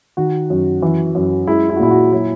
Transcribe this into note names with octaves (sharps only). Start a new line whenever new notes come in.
D#3 F#4
F#2
E3
F#2
G#3 E4
E4
F#4
A#2 E4
F#4
F#3 E4